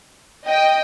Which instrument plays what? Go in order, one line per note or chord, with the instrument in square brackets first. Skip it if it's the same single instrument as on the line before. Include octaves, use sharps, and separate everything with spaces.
[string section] D#5 G5